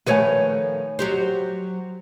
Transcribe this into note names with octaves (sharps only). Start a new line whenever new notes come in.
D#3 F3 A3 B4 C#5 G#5
F#3 G4 C5